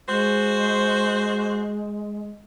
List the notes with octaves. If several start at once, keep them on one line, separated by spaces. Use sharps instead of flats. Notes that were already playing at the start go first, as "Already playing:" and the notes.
G#3 F#4 C5